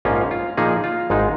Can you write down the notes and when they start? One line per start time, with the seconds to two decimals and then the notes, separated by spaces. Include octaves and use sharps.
0.05 A#1 G#2 F3 A#3 C#4 F4
0.31 F4
0.57 A#2 F3 A#3 D#4 G#4
0.84 F4
1.10 G#1 G#2 G#3 D#4